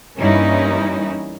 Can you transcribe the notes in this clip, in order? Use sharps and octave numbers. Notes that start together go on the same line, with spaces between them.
G2 E3 A#3 C#4 D#4 E4